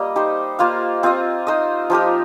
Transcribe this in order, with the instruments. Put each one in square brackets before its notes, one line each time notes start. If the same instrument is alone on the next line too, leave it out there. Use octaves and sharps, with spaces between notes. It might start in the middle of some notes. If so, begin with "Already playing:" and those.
Already playing: [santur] G3 A#3 D#5
D#4 G4 C5
A#3 F4 C5 F5
C4 F4 D#5
D#4 C5 D#5
F3 D#4 G4 A#4